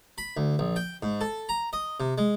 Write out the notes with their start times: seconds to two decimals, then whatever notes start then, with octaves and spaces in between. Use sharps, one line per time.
0.18 B5
0.37 D2
0.59 A#1
0.76 G5
1.03 G#2
1.21 A4
1.49 A#5
1.73 D#5
2.00 C3
2.18 G#3